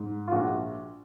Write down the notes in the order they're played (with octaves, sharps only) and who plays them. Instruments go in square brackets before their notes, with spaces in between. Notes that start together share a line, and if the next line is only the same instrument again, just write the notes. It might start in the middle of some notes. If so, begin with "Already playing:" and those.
Already playing: [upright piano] G#2
F4
A#1 F#4